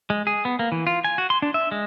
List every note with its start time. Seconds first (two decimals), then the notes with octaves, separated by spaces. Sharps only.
0.10 G#3
0.27 G#4
0.45 B3
0.59 A#3
0.72 E3
0.87 F4
1.04 G#5
1.18 F#4
1.30 C6
1.42 D4
1.54 E5
1.72 G#3